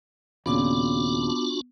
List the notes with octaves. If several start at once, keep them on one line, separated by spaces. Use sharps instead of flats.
D#2 A#2 C#3 B3 D4 F4 F#4 D6